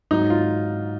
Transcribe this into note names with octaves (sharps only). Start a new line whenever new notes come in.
G#2 F#3 D#4
F4